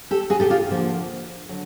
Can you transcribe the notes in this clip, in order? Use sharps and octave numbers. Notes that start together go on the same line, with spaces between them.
G4 A4
F#4 G#4
G4 A4
F4 G4
D3 F3 A#3
D3 F#3